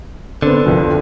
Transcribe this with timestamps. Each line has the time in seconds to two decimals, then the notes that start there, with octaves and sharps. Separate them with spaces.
0.42 D3 B3 C4
0.66 C2 F2 F3